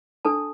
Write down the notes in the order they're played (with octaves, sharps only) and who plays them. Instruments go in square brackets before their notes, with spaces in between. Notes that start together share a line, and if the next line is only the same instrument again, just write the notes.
[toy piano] D4 A4 A5